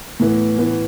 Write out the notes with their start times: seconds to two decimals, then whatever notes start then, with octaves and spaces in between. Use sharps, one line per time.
0.20 A2 E3 B3
0.58 A2 E3 B3